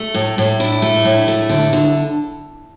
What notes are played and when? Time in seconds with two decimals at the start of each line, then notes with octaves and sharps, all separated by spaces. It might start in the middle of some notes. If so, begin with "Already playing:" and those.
Already playing: A3
0.14 A2
0.38 A2
0.60 D4 E4
0.82 A3
1.05 A2
1.28 A3
1.49 D3
1.73 D3